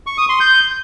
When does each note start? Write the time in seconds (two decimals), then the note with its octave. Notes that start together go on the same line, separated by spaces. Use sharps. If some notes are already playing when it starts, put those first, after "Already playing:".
0.07 C#6
0.18 D#6
0.29 C6
0.40 G6